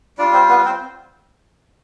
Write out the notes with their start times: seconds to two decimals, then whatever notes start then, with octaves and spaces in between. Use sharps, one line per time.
0.18 G3 D4 F4 D5
0.33 C4 C5
0.49 B3 B4
0.65 C4 C5